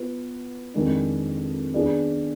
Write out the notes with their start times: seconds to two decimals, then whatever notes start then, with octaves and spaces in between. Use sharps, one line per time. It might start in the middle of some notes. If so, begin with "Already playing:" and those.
Already playing: B3 F4 B4
0.74 F2 D#3 G#3 D4
1.74 D#3 B3 D4 G#4 D5